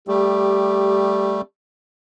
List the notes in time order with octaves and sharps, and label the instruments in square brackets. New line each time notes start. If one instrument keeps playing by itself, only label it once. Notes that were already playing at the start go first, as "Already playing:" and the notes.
[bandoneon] G3 A3 [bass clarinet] G4